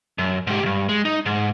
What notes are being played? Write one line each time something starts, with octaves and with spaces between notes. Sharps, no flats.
F#2
G#2 G4
C#2 G2
G#3
D#4
G#2